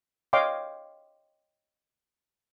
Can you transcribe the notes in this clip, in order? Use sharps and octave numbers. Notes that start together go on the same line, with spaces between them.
C#5 D#5 F5 G5 C6 D6